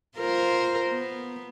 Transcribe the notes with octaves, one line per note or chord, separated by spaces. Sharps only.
F4 A#4 C5
B3